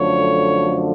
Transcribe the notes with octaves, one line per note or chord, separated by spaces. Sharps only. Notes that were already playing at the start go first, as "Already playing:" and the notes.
Already playing: F#2 D3 F3 A3 C#5